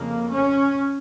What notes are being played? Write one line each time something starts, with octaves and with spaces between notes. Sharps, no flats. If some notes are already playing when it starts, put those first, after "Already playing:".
Already playing: F2 C#3 A#3
C#4